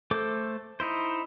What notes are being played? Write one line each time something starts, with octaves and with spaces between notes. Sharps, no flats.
A3 A4 C5 D6
D#4 E4 C5